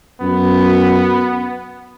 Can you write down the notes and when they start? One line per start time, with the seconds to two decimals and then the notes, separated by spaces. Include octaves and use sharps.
0.21 F#2 B3